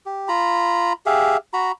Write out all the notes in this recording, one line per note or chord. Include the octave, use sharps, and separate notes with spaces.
G4
F4 A#5 B5
G4 G#4 E5 F5
F#4 A#5 B5